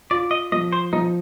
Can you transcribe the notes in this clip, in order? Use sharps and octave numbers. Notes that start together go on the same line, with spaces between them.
F4 D5
D#5
F3 D#5
C5
F3 D#4